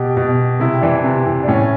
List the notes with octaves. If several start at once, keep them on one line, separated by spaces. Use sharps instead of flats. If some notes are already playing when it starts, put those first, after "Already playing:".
Already playing: B2 G4
B2
C3 E4
E3 D4
C3
E3
D4
A2 C#4